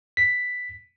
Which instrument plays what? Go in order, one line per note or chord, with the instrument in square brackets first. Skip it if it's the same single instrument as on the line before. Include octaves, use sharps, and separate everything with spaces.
[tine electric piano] B6